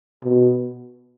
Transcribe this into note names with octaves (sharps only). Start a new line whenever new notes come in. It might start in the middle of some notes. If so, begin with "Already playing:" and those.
B2